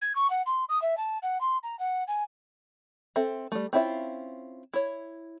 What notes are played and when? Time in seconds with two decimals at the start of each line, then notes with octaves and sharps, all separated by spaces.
0.02 G#6
0.15 C#6
0.30 F#5
0.46 C6
0.69 D#6
0.82 E5
0.97 A5
1.22 F#5
1.41 C6
1.63 A#5
1.79 F#5
2.08 G#5
3.16 C4 A4 E5
3.52 G3 A3
3.73 C4 C#4 E4 F4 E5
4.74 E4 C#5